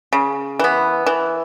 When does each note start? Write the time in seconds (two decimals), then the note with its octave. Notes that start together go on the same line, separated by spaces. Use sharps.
0.13 C#3
0.59 E3 B3
1.06 E3